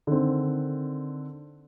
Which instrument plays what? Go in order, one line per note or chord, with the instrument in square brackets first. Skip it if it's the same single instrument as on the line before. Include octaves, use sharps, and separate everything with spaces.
[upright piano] D3 D#3 C4